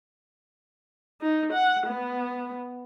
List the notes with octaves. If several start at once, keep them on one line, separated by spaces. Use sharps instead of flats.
D#4
F#5
B3